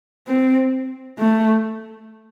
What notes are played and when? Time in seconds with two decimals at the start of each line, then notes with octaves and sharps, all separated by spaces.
0.28 C4
1.19 A3